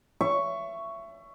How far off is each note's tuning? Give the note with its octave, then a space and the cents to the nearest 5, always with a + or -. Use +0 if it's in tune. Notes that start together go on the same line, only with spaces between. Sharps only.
E5 +25 C#6 +5